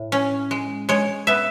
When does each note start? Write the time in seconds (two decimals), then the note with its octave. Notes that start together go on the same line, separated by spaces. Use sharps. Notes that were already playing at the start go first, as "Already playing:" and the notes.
Already playing: A2
0.12 C#4
0.51 G#3
0.89 G#3 C#5
1.27 B3 E5